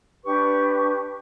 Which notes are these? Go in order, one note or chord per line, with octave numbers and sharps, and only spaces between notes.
D4 G4 B4 C#6